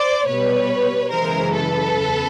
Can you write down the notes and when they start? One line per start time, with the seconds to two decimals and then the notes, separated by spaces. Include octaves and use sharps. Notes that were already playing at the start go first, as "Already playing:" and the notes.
Already playing: C5 D5
0.27 B2 G3 B4 C#5
1.11 F#2 C#3 E3 G#3 A#4 C5
1.54 A4 B4
1.95 E2 C#3